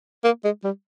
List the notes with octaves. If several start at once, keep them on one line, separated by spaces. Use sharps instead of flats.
A#3
G#3
G3